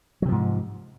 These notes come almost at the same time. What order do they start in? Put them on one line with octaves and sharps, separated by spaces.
F#3 C3 F3 G#2